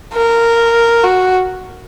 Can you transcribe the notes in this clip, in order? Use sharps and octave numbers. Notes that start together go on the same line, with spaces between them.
A#4
F#4